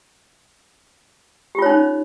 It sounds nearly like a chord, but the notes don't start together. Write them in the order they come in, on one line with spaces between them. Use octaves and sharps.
G4 F4 C#5 D#4 C#4